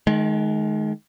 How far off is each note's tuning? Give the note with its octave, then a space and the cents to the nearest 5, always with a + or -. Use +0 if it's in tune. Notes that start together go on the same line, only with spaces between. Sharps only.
D#3 +0 G#3 +35